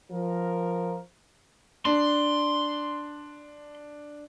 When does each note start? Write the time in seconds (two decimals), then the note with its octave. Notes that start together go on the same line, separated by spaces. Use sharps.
0.11 F3 A#4
1.85 D4 C6